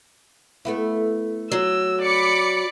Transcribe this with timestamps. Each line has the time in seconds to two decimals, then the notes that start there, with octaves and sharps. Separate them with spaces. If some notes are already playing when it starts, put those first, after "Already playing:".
0.65 A3 B3 E4
1.52 F#3 E6
2.02 D5 B5 D6 C#7